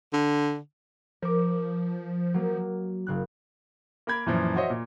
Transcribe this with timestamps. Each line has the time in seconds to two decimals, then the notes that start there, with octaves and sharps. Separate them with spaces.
0.13 D3
1.22 F3 A#4 D6
2.34 F#3 A#3
3.07 F#1 C#3 F#6
4.07 A#3 A#4 B5 G#6
4.26 F#2 A#2 E3 F3
4.56 F#4 C5 C#5 D#5 E5
4.70 A#2